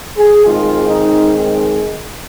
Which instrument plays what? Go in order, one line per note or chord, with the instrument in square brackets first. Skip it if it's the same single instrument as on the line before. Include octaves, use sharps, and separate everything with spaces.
[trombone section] G#4
D#3 G#3 C4 F4
D#4